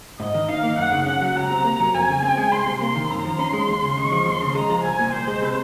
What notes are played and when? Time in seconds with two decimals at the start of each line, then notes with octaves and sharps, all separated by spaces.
0.19 G#2 D#5
0.34 D#3
0.48 D#4 F5
0.63 A#3
0.77 F#2 F#5
0.92 C#3
1.06 C#4 F#5
1.22 F#3
1.36 C#2 A#5
1.50 C3
1.65 A#3
1.80 F#3
1.94 F2 G#5
2.08 C#3
2.23 C4
2.37 G#3
2.52 C2 C6
2.66 C3
2.80 A#3 C6
2.95 D#3
3.10 F#2 A#5
3.24 F3
3.39 C#4 C6
3.53 G#3
3.68 D#2
3.83 C#3
3.98 G#3 C#6
4.12 F3
4.26 D#2 C6
4.41 C#3
4.55 G#3 A#5
4.70 F3
4.84 C2 G#5
4.99 A#2
5.13 C2 C5
5.28 G#3
5.42 C3